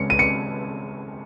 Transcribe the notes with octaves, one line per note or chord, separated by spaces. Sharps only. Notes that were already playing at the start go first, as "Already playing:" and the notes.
Already playing: C#3 G#3 C#4 C#7
D#7
C#7